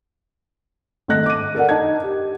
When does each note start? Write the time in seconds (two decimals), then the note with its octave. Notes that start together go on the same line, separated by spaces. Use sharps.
1.08 G#1 A3 D#5 F#6 A#6
1.26 D6 D#7
1.55 A4 A#4 D5 F#5
1.69 D#4 A5 G#6
2.04 G4